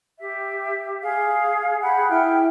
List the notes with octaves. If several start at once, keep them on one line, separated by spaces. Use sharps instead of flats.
G4 E5
G#4 F5
G4 G#4 F#5 B5
E4 G5 F6